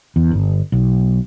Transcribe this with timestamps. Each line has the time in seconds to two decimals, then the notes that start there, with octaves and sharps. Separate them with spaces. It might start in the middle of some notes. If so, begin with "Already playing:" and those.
0.16 E2
0.31 G1
0.72 B1